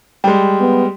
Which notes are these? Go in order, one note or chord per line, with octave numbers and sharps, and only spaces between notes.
G3 G#3 G5
B3